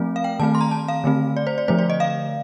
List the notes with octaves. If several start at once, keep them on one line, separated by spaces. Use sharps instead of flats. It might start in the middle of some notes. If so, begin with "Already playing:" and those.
Already playing: F3 A3 C4
F5
G5
D#3 A3 C4 A5
C6
A#5
A5
F5
D3 A3 C4
D5
C5
D5
D3 F3 A3 C5
D5
D#5
F5